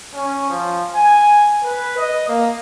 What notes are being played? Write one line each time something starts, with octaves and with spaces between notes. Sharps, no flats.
C#4
F3
G#5
B4
D#5
A#3